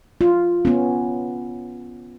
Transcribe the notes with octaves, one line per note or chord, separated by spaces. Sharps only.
F4
B3 C#4